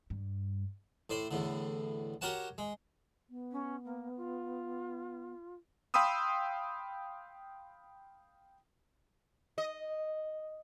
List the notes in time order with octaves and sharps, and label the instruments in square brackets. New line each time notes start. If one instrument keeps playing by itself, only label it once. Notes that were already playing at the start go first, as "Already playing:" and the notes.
[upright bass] G2
[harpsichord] A2 C5 D5
E2 A2 D3
F#4 G4 A#4 C#5 F#5 A5
G#3
[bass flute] B3
[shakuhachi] C#4
A#3
F4
[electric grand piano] F5 G5 B5 C6 D#6 E6
[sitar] D#5